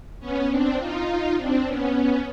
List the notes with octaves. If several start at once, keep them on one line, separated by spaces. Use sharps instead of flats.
B3 C#4
C4 D4
D#4 F4
C4 D4
B3 C#4